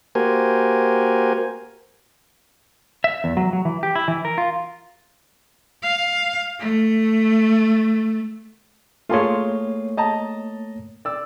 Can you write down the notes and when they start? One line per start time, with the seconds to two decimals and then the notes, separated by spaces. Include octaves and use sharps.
0.15 A#3 F#4 G4 A#4 C5 G#5
3.04 E5
3.24 E2
3.37 F#3
3.53 F#3
3.65 E3
3.83 G4
3.95 E4
4.08 E3
4.25 A#4
4.38 F4
5.83 F5
6.59 A3
9.09 A3 A#3 F4 G#4 C#5 C6
9.97 D#5 A5 A#5
11.05 D5 E6